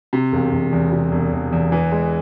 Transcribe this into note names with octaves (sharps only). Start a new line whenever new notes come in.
C3
E1
E1
E2
C3
E1
E1
E2
E3
G#3